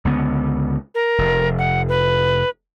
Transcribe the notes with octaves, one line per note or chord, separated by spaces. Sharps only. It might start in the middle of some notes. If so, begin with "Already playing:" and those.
C#2 D3 B3
A#4
F1
F#5
B4